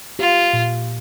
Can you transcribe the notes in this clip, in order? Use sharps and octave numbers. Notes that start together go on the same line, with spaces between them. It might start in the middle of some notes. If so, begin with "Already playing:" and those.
F4 G4
A#2